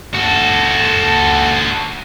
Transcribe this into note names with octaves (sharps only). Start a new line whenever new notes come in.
F#4 A4